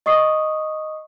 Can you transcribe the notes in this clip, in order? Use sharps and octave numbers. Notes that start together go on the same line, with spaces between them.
D#5 C#6 D#6 C7